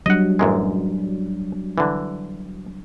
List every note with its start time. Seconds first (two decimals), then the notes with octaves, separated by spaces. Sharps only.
0.06 F#3 G3 D4 D#5 F#5
0.39 A1 F#2 G#3
1.78 D3 E3